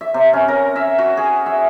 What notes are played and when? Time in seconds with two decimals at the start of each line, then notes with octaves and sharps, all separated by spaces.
0.01 E5
0.14 C3
0.33 C#4
0.48 A#4
0.76 E5
0.98 F#4
1.17 G#4
1.46 E5